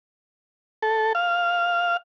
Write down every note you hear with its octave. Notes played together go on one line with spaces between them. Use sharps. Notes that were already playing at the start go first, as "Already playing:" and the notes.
A4
F5